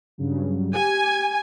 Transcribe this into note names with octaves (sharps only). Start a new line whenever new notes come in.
G2 C#3 F#3
G4 G#5